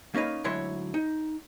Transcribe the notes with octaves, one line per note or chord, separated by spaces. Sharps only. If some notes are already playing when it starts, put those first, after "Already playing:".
A#3 C#4 D#4 B4 F5
D2 G#2 F#3 E4 C#5 C6
D#4